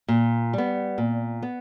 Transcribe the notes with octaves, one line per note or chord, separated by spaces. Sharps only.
A#2
G3 B3
A#2
B3